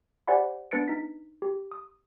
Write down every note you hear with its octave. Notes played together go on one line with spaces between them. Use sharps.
G4 C5 D5 F#5 G#5 B5
B3 D4 B4 A6 C#7 D7
D#4 B6
G4
D#6